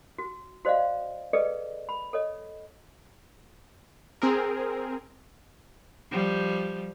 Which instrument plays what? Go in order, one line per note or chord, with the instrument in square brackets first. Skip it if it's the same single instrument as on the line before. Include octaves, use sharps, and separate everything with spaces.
[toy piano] F#4
F#4 C5 D5 D#5 F5
G#4 A4 B4 D5 D#5
B5
A4 C#5 D#5
[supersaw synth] C4 G#4 A#4
[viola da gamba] F3 G3